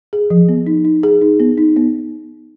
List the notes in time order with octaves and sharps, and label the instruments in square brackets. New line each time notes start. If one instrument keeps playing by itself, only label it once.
[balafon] G#4
F3
B3
D#4
D#4
G#4
D#4
B3
D#4
B3